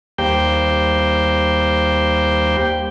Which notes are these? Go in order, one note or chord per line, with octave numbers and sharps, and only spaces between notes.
D#2 G3 A#3 G4 C5 G5